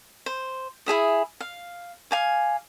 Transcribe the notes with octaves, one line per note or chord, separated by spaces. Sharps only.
C5
E4 G#4 E5 D#6
F5
F5 G#5 D6